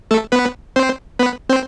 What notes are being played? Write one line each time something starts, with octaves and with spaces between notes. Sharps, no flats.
A3 A4
B3 B4
C4 C5
B3 B4
C4 C5